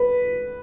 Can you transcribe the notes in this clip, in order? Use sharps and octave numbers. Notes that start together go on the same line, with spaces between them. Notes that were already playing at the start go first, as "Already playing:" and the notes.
Already playing: B4